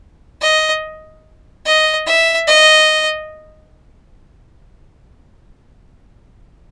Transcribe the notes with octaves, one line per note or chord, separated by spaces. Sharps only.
D#5
D#5
E5
D#5